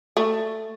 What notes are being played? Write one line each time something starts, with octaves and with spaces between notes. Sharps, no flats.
A3